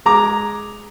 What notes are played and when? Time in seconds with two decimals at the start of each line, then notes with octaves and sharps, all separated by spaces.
0.06 G#3 A#5 D6